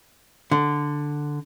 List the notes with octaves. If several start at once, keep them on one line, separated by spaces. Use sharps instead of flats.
D3